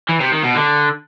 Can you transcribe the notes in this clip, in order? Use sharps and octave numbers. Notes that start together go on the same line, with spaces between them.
E3
C3
D#3
B2
D3